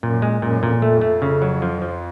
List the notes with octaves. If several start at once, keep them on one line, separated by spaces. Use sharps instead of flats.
F#2 A#2
G#3
F#2 A#2
F2 A#2
F2 A3
A3
C#3
F#3
F3
F3